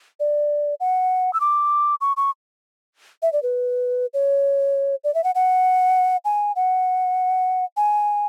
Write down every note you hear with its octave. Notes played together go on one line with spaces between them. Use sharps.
D5
F#5
E6
D6
C#6
C#6
E5
D5
B4
C#5
D5
E5
F#5
F#5
G#5
F#5
G#5